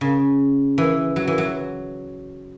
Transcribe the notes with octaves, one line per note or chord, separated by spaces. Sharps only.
C#3
E3
F#3
E3
F#3